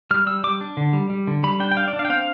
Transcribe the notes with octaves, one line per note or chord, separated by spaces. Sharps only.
G3 F6
G3 E6
G3 D6
D4
D3
G3
G3
D3
G3 B5
D4 G5
G5
D4 F5
D5
D4
F5
G5
C4 F5